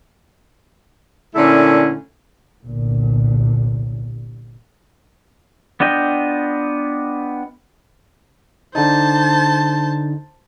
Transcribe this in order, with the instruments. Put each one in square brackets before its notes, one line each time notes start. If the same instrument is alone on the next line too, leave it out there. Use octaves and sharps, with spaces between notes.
[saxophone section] A#2 D3 A3 C#4 E4
[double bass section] G1 C2 A#2
[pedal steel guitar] B3 D4 F4 D#5 G5
[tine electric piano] D3 D#4 [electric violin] C5 A5